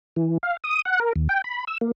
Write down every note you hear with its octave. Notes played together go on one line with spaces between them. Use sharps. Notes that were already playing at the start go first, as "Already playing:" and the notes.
E3
F5
D#6
F#5
A#4
D#2
G5
B5
E6
A#3